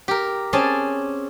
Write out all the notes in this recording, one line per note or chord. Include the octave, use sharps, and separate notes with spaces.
G4 A#4
C4 C#4 G#4 D5 G#5 A5